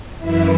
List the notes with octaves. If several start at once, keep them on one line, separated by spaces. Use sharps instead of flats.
F#2 E3 E4 E5